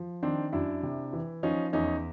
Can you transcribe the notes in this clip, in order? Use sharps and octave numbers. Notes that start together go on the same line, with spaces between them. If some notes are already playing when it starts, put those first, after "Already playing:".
Already playing: F3
D#3 C4 D4
F#2 D4 E4
C3
E3
F3 C#4 D#4
E2 C#4 D#4